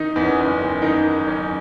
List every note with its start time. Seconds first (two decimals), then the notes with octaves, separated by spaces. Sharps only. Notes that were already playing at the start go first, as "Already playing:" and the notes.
Already playing: D#3 D#4
0.16 E2 B3
0.23 C#4
0.39 F#1
0.60 F#1
0.82 D#3 D#4
1.05 D#3
1.26 F#1 C#4